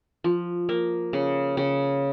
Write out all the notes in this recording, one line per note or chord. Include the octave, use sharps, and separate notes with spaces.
F3
A#3
C#3
C#3